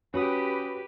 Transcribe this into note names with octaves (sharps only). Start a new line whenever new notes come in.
C#4 F#4 G4 B4 C#5 D#6